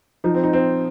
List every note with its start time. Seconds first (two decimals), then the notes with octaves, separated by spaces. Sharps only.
0.24 F3 D#4
0.34 C4
0.44 D#4
0.53 C4